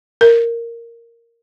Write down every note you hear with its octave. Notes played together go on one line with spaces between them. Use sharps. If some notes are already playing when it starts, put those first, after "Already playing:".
A#4